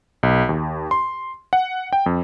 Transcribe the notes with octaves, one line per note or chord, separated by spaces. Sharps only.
B1
D#2
C6
F#5
G5
F2